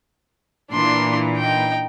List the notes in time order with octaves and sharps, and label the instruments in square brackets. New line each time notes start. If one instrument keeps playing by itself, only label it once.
[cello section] A#2 E3 A#3 [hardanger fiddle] D4 C6
[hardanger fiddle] D#4 G5